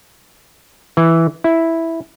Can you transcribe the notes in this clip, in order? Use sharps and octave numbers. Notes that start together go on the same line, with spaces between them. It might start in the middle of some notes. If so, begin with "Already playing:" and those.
E3
E4